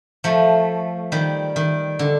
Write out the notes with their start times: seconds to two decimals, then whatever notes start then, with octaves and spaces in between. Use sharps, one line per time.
0.24 F3 A3
1.12 D#3 G3
1.56 D#3
1.99 D3